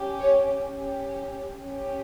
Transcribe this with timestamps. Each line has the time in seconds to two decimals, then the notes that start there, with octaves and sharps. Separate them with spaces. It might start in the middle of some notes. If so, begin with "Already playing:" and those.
Already playing: C#4 G4
0.19 C#5
0.77 C#4 G4
1.63 C#4 G4